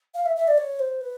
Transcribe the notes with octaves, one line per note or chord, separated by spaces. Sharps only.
F5
E5
E5
D5
C#5
C5
B4